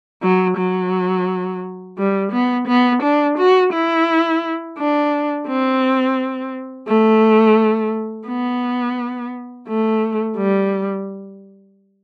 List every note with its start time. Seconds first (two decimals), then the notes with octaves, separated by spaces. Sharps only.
0.22 F#3
0.57 F#3
1.98 G3
2.32 B3
2.68 B3
3.02 D4
3.38 F#4
3.73 E4
4.78 D4
5.47 C4
6.88 A3
8.27 B3
9.68 A3
10.37 G3